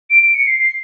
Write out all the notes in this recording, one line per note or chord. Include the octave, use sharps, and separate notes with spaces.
D7
D7
C#7
C7
C7